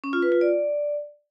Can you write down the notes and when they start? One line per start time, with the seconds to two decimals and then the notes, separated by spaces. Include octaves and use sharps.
0.04 C#4
0.13 F4
0.22 B4
0.32 F4
0.41 D5